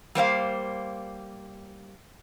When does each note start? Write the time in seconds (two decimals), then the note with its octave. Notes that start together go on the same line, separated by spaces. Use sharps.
0.15 G3 A#3 C5 F5